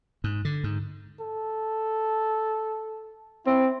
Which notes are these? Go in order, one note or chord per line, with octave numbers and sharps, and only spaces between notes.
G#2
D3
G#2
A4
C4 E4